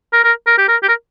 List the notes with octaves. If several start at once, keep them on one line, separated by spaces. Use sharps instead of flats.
A#4
A#4
A#4
G4
A#4
G4
A#4